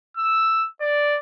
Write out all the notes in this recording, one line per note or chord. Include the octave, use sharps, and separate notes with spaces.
E6
D5